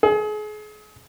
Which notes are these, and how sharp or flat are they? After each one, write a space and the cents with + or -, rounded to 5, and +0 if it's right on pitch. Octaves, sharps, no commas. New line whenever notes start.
G#4 +35